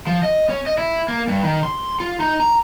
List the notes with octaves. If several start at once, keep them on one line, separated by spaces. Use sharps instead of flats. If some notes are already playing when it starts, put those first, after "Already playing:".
F3
D#5
C#4
D#5
E4
A#3
G2
D#3
C6
F4
D#4
A#5